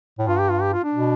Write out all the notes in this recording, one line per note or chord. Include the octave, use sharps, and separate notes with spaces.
A2
G2 F4
G4
F4
G4
F4
D4
B2